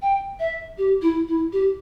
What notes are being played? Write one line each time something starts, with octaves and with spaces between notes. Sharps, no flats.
G5
E5
G4
E4
E4
G4